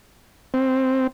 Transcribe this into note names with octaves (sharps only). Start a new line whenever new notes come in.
C4